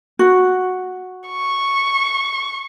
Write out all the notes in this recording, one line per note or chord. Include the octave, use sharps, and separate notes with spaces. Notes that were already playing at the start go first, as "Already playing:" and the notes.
F#4
C#6